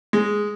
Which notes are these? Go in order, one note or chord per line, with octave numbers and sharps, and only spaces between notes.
G#3